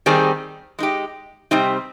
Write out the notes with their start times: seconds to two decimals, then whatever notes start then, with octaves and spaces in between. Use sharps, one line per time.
0.06 D#3 G3 C4 D#4 G#4
0.79 G#3 D#4 G4
1.51 C3 G3 C4 D#4 G4